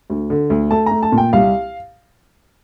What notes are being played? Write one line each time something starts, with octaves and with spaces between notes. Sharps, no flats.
D2
D3
D2
A3 A5
A3 A#5
A5
A#2
G5
C2 F5